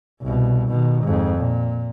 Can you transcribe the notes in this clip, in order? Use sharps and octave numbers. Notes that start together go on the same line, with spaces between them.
C2 B2
B2 D#3
F2 G#2
A#2